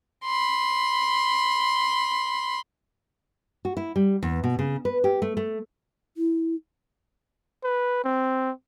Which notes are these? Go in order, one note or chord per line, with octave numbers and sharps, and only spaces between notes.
B5 C6
F#4
E4
G3
E2
B2
C#3
B4
G4
A3
A3
E4
B4
C4